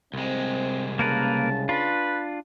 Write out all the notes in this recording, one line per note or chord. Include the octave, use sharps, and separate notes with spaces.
C2 G#3 C4
C#3 A#3 A#4 B4 A5
D4 F4 B4